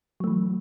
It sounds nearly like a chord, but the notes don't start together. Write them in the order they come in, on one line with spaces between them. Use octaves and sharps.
F#3 A3 E3